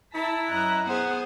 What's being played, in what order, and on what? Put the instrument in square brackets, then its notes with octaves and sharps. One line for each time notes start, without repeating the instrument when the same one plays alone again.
[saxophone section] E4 [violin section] A5 A#5 B6
[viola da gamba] F#2 [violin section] D#5 A#5 F#6
[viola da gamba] B3 G#4 C5 [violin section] F#5